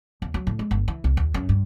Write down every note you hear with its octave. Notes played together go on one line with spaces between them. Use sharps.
D#2
F#3
A2
G#3
G1
E3
C2
D#2
F#2
G2